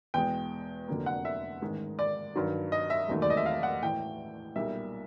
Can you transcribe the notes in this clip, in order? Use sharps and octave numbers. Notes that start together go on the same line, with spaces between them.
E2 B2 G#3 G5
F1 F2 D3 F#3 A#3
F#5
E5
A1 G#2 D#3 G#3
D5
G2 D#3 F#3
D#5
E5
E1 D#2 D#3 F#3 A3
D5
D#5
E5
F5
F#5
A2 E3 A3 G5
B1 A#2 G3 A#3 D#4 E5